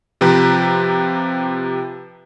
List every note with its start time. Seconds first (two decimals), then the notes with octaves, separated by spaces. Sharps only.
0.21 C3 F3 G4 B4 A#5